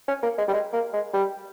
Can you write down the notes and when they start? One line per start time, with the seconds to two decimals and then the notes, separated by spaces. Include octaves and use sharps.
0.08 C#4
0.23 A#3
0.38 G#3
0.48 G3
0.53 G#3
0.73 A#3
0.93 G#3
1.13 G3